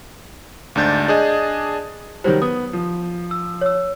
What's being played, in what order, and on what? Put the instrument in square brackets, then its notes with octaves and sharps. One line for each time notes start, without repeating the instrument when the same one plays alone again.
[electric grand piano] D2 G#2 D4 G6 A6
D4 G#4 D#5
[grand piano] D#3 F#3 G3 [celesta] C5
[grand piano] B3 [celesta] D#6
[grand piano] F3
[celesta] E6
C#5 E6